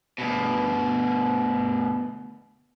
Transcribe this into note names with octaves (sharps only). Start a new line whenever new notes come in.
D2 B2